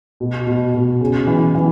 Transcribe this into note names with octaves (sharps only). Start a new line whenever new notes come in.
B2
B2
B2
C#3
E3
E3